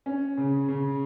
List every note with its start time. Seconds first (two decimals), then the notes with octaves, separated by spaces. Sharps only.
0.06 C#4
0.38 C#3
0.68 C#3